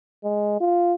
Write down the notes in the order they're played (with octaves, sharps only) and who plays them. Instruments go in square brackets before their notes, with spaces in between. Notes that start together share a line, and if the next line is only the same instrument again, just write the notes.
[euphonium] G#3
F4